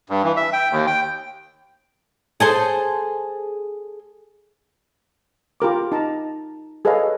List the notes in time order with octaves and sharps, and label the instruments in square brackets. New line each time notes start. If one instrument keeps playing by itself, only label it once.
[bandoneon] G2
E3
E5
G5
D#2
G5
[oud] G#4 A4 C5
[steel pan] F4 G4 A#4 D6
D#4 A5 A#5
G#4 A4 B4 C#5 D#5 F5